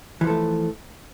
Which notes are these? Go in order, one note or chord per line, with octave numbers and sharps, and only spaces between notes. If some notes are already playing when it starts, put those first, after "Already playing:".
E3 F3 A3 A4